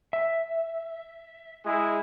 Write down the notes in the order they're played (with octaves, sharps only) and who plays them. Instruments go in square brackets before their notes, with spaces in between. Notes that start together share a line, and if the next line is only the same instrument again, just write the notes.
[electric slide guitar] E5
[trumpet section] G#3 E4 G#4